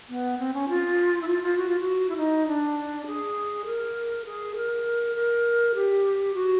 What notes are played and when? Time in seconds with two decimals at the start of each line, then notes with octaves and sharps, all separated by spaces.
0.09 B3
0.38 C4
0.54 C#4
0.69 F4
1.22 E4
1.28 F4
1.43 F4
1.58 F#4
1.69 F4
1.80 F#4
2.09 E4
2.17 D#4
2.47 D4
3.07 G#4
3.66 A#4
4.25 G#4
4.56 A#4
5.15 A#4
5.75 G4
6.34 F#4